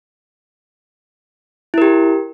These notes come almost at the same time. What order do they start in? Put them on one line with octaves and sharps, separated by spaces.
E4 A#4 G4